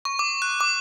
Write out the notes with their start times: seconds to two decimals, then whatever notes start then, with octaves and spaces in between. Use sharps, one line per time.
0.05 C#6
0.19 D6
0.42 F#6
0.60 D6